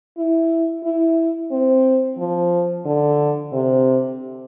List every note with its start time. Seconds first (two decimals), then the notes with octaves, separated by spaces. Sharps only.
0.18 E4
0.84 E4
1.51 C4
2.18 F3
2.86 D3
3.53 C3